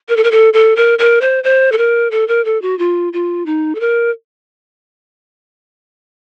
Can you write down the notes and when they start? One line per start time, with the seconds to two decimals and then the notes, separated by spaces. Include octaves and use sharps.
0.09 A#4
0.17 A4
0.24 A#4
0.31 A4
0.53 A4
0.76 A#4
0.99 A#4
1.21 C5
1.44 C5
1.72 A4
1.78 A#4
2.11 A4
2.28 A#4
2.45 A4
2.62 F#4
2.79 F4
3.13 F4
3.46 D#4
3.75 A4
3.80 A#4